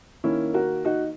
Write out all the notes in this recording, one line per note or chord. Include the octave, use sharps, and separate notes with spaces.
D#3 A#3 C#4 E4
F#4 A#4
D#4 F#4